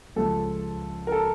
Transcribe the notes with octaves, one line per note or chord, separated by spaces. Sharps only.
C#2 C#3 F3 G#3 A4
A#4
A4